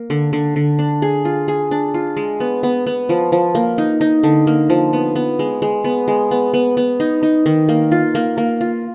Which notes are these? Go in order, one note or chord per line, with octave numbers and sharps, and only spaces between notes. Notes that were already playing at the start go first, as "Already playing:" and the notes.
Already playing: A#3
D3
D3
D3
D4
G#4
F4
G#4
D4
F4
G#3
B3
B3
B3
F3
F3
A#3
D#4
D#4
D3
A#3
F3
B3
B3
G#3
G#3
B3
G#3
B3
B3
B3
D#4
D#4
D#3
A#3
F4
A#3
A#3
F4